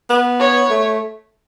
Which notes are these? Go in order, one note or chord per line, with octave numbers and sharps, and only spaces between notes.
B3
C#5
A3